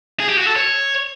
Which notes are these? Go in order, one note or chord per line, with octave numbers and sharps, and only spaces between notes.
G#4
G4
F#4
A4
C#5